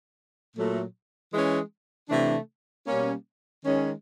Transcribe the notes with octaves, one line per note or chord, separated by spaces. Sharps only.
A#2 F#3 A3
E3 G#3 C#4
C3 E3 A3 D4
B2 G3 A#3 C#4
D#3 G#3 C#4